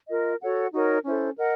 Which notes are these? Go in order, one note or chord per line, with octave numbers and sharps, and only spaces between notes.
F4 A#4 D#5
F#4 A4 C#5 F#5
D#4 F#4 A#4 C#5
C#4 E4 A4 C5
A#4 D#5 F#5